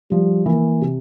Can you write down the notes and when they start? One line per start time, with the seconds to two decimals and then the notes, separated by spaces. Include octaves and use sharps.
0.11 F3 G3
0.46 E3 A#3
0.81 C3